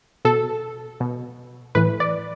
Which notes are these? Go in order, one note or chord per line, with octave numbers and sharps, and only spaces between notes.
B2 A4
B2
A2 E3 B4
D5